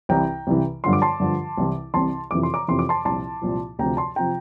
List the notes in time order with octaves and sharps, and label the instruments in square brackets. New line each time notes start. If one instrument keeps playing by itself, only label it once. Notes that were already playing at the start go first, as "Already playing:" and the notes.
[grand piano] C2 C3 E3 G5 A#5
C2 C3 E3
G2 D3 F3 C6
D6
A5 C6
G2 D3 F3
C2 C3 E3
C2 C3 E3 A5 C6
F2 C3 E3 D6
C6
A#5 D6
F2 C3 E3 C6
D6
A5 C6
C2 A#2 F3 A5 C6
C2 A#2 F3
D2 C3 F3 G5 A#5
A5 C6
C3 F3 G5 A#5